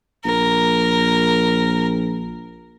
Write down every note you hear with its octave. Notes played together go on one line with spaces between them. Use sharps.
A#1 A#4